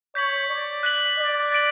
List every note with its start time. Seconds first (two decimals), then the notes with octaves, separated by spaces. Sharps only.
0.15 C#5 G6 B6 F#7
0.49 D5
0.83 F#6 B6 F#7
1.18 D5
1.52 A6 D7 F#7